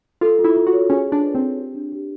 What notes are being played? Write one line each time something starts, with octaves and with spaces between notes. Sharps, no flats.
F4 A4
F4
E4
F4
F#4
C#5
C#4 G#4
F4
D4
B4
C4
B4
G4
D4
G4